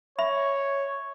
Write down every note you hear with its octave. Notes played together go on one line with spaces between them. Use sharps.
C#5 E5 B5